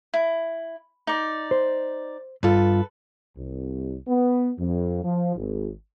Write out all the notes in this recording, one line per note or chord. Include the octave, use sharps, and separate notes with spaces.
E4
D#4 D5
C5
G2 F4 A4 B4
C2
B3
F2
F3
G#1